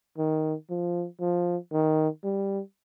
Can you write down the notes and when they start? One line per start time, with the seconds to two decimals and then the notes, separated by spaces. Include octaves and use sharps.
0.18 D#3
0.70 F3
1.21 F3
1.72 D#3
2.24 G3